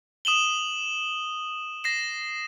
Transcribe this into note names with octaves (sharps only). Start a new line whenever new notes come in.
D#6 E7 F#7 G7
A#6 C7 E7